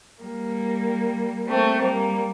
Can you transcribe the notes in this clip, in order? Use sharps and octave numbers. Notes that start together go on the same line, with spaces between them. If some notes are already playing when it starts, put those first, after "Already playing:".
G3 A#3
A3 C4
G3 A#3